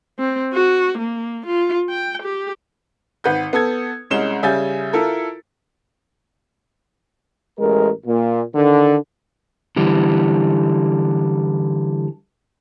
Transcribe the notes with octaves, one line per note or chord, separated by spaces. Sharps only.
C4
F#4
A#3
F4
G5
G4
G#1 B4 F#5 G6
B3 A4 G#6
C2 G#3 C#4 E7 G7
C#3 G3 E5 G#5 G6 A6
E4 F4 A4 A#4
A1 G#3 A#4
A#2
D3 D#3
D3 E3 G3